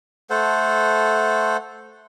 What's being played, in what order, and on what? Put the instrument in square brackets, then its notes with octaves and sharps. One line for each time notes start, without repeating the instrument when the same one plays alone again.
[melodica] A3 A4 C5 F#5